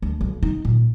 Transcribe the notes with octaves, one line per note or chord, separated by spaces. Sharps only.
D2
B1
D#4
A#2